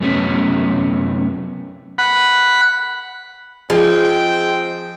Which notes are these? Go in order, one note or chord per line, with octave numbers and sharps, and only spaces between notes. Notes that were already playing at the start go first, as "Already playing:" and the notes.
F#2 C3 A3 B3 C#4
F#5 B5
F3 G#3 C4 G5